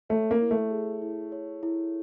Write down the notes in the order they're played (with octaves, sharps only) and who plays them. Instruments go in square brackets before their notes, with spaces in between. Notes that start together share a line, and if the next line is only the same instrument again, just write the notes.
[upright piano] A3 [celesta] C#5
[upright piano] A#3
[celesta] E4
[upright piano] A3
[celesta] G#4
E4
C#5
E4